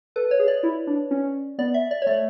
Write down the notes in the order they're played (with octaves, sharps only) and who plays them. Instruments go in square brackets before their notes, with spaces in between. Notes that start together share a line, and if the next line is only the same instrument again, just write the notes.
[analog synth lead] A4 [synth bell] B4
[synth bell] C#5
[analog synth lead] G#4
[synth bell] D5
[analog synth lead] E4
D4
C#4
[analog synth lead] B3 [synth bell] D5
[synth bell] E5
D5
C#5
[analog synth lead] A3 [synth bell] D5